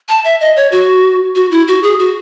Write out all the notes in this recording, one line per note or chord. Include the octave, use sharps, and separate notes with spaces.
A5
E5
D#5
C#5
F#4
F#4
E4
F#4
G#4
F#4